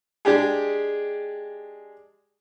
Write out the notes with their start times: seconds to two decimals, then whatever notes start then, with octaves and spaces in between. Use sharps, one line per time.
0.25 G#3 D4 G4 G#4